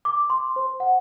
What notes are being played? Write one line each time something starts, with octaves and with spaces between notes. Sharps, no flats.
D6
C6
C5
F#5